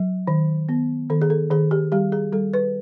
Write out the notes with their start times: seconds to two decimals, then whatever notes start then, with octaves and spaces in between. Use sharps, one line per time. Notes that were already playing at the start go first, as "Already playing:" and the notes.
Already playing: F#3
0.27 D#3
0.69 B3
1.10 D#3 A4
1.22 G#4
1.30 A4
1.50 D#3 G#4
1.71 G4
1.92 G3 G4
2.12 G#4
2.32 G3 A4
2.54 B4